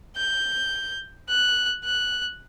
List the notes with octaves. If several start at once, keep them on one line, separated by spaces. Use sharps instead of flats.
G6
F#6
F#6